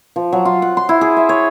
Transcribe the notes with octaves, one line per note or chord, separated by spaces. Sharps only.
F3
F#3
F4
F#5
C6
E4
G#4
E5
C#5